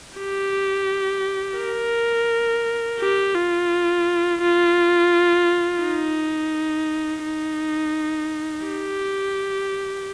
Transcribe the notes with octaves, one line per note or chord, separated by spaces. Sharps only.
G4
A#4
G4
F4
F4
D#4
D#4
G4